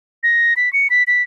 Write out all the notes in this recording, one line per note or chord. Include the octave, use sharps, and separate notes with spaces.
A#6
B6
C#7
B6
B6